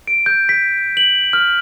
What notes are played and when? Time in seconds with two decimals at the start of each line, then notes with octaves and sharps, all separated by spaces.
0.07 D7
0.26 G6
0.49 B6
0.97 F#7
1.33 F6